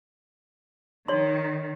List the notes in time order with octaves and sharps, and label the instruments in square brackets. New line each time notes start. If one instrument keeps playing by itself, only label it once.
[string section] D#3 [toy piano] C#5 C6